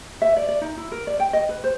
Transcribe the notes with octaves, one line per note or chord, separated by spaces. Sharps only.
E5
D5
D5
D#4
E4
A#4
D5
G5
D#5
B4
C5